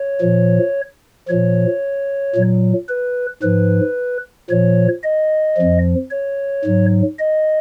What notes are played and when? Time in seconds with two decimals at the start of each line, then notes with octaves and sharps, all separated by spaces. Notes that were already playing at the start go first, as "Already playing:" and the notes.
Already playing: C#5
0.21 A#2 F3
1.28 A#2 F3 C#5
2.35 A#2 F#3
2.89 B4
3.42 G#2 F3 B4
4.50 A#2 F3 C#5
5.03 D#5
5.57 F2 F3
6.11 C#5
6.64 G#2 F#3
7.18 D#5